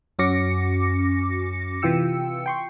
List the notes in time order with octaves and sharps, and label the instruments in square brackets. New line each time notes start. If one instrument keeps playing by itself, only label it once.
[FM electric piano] F#2 C#4 F#4 D6 A#6 C#7
C3 E3 F4 G5 E6 C#7
G5 C6 C#6